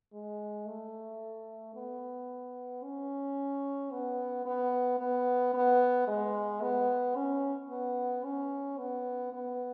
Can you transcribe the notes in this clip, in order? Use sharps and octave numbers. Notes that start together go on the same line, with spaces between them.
G#3
A3
B3
C#4
B3
B3
B3
B3
G#3
B3
C#4
B3
C#4
B3
B3